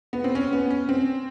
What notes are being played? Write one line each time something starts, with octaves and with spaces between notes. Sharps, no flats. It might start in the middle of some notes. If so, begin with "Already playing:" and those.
B3
C4
C#4
B3
C#4
C4